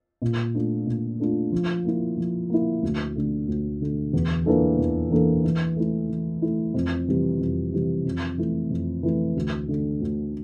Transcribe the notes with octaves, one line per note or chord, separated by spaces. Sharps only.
A#2
A3 D4 F4
A#2
A3 D4 F4
F3
A#3 E4
F3
A#3 E4
D2
D3 A3
D2
D3 A3
E2
E3 A#3 D4 A4
E2
E3 A#3 D4 A4
E3
A3 E4
E3
A3 E4
F2
C3 E3 G3
F2
C3 E3 G3
F2
E3 A3 E4
F2
E3 A3 E4
D2
D3 A3
D2